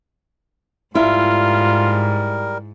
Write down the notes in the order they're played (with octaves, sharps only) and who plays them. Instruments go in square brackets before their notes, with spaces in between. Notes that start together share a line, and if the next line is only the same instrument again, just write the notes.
[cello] G#2 [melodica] G3 A#4 [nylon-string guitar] E4 [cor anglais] F4